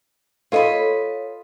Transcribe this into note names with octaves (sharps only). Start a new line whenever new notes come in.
F4 A4 B4 C#5 D#5 B5